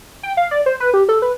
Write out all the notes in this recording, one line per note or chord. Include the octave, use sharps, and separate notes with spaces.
G5
F5
D5
C5
B4
G4
A4
B4